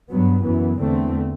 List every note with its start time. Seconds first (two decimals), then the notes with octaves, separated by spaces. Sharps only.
0.09 G2 F#3 B3
0.44 F#2 E3 B3
0.79 E2 D3 A3 C4